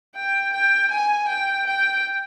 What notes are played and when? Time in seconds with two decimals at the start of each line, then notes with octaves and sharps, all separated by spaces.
0.16 G5
0.53 G5
0.91 G#5
1.29 G5
1.67 G5